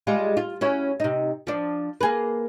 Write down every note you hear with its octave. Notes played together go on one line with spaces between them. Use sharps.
G3 G#3 F4
F4
C#4 E4 F#4
C3 D#4
F3 D4
A#3 G#4 B4